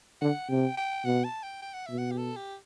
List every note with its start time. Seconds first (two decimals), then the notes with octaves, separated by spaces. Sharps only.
0.21 D3 F#5
0.49 C3 G5
0.77 G5
1.05 B2 F#5
1.24 A5
1.43 G5
1.62 G5
1.73 F#5
1.86 B2 E5
1.98 F#5
2.11 G4
2.17 A4
2.36 G4